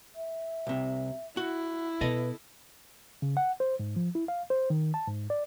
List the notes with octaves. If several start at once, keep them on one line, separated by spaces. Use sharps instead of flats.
E5
C2 C3
E4 F#4
B2 A4 B4 D#5
C#3
F#5
C5
G#2
F3
E4
F5
C5
D#3
A5
G#2
D5